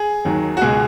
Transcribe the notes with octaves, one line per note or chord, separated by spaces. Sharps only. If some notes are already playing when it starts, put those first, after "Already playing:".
Already playing: G#4
D#2 D#3 F#3
F#4
C#2 B2 G#3 G#4